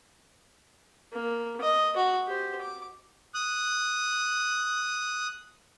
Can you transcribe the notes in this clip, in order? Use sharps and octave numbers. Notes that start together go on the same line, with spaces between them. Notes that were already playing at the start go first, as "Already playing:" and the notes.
A#3
D#5
F#4
G4 C5
D6
D#6 F#6